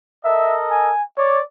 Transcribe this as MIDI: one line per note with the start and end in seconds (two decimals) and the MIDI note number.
0.25 0.90 69
0.25 0.90 70
0.25 0.90 75
0.25 0.57 76
0.71 1.03 80
1.18 1.40 73
1.18 1.42 74